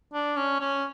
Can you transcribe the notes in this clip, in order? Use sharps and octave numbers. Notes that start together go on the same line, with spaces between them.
D4
C#4
C#4